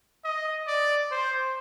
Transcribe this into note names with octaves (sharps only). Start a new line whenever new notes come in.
D#5
D5
C5